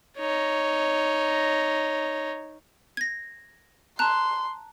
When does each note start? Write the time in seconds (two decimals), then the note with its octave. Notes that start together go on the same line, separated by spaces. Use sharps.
0.18 D#4 C#5
2.97 G#6 A#6
3.99 A5 A#5 C6 F#6